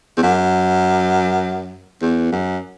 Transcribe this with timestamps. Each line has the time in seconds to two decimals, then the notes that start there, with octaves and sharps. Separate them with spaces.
0.17 E2
0.23 F#2
2.02 E2
2.32 F#2